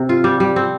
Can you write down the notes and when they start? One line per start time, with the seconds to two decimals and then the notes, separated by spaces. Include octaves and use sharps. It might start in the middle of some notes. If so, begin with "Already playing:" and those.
Already playing: C3
0.09 F4
0.24 G3
0.40 G3
0.56 C4